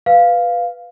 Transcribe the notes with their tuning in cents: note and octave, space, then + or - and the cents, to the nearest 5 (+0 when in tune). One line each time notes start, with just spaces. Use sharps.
B4 +0 F5 +0